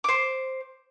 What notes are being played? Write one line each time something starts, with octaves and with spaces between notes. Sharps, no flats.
C5 D6